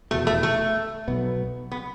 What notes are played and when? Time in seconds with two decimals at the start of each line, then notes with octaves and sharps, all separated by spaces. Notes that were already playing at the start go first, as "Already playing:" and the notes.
0.11 F1 E2 B2 A3
0.27 A3
0.43 A3
1.08 B1 B2 B3
1.72 B3